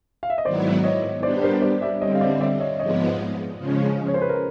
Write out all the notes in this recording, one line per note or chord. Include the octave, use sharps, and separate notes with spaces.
F5
E5
D#5
G#2 D#3 F#3 B3 E4 C5 D5
C#5 D#5
G3 B3 D4 G4 C5 D5
A#4 C5
C5 D5
D5 E5
D3 G3 C4 C#5 D#5
F5
D5 E5
D5 E5
C#5 D#5
G#2 F3 G#3 B3 C#5 D#5
C#3 F3 G#3 C#4
C#5
C5
B4
A#4